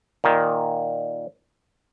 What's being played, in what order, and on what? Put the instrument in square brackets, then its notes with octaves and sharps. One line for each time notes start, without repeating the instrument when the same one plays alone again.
[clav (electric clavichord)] A#2 D#3